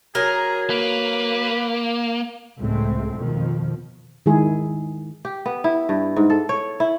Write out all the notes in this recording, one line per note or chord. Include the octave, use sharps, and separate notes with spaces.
F#3 G#4 A#4
A#3 B4
C#2 A2 G#3 A3 C4
F2 B2 D#3 F3
D#3 G#3 E4 G#4
G4
B3
E4
G2
G#2
A4
C#5
E4